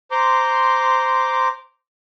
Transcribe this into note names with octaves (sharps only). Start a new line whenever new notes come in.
C5 A#5 C6 D6